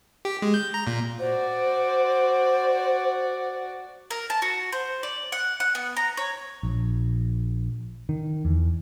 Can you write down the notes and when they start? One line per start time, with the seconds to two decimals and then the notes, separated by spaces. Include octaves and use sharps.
0.25 G4
0.42 G#3
0.54 G6
0.74 A#5
0.87 A#2
1.19 F#4 C5 D5
4.11 A#4
4.30 A5
4.42 F#4
4.72 C5
5.03 D5
5.32 F#5
5.60 F#5
5.75 B3
5.97 A#5
6.17 C#5
6.63 A#1
8.09 D#3
8.45 E2